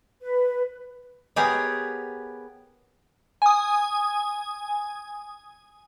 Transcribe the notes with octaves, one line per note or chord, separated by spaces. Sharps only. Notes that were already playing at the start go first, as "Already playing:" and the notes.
B4
B3 G4 G#4 A#4 C#5
G#5 D#6